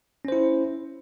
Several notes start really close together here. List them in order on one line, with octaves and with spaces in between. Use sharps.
C#4 C5 E4